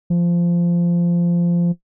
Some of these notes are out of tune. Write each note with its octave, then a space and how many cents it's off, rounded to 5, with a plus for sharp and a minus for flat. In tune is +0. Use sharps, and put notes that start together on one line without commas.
F3 -15